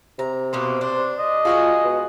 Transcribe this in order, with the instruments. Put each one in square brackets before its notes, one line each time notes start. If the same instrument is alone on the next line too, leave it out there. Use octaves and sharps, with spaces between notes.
[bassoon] C3 [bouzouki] A#5
[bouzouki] B2 A#3 B3 [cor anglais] C5
[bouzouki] D4 [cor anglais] C5
[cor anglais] D#5
[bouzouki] G#3 F#4 G#4 [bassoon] F4
[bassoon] B2